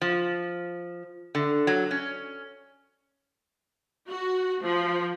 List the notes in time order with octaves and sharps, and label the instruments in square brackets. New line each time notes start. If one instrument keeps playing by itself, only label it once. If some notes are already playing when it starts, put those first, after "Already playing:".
[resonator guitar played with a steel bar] F3
D3
F#3
C#4
[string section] F#4
F3